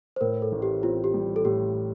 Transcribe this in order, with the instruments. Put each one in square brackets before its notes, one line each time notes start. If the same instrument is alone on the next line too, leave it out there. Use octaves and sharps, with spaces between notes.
[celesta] C5
[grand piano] A2 [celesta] A#4
[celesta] A4
[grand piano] A1
[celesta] G4
[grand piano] C4 [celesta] F4
[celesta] G4
[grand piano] G3
[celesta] A4
[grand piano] A2 [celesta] G4